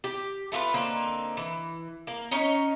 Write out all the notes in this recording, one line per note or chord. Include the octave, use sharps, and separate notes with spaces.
G4
A3 F4 F#4 B4
D3 A#3 C4 D#4
E3
A#3
C#4 D#4 C#5 D#5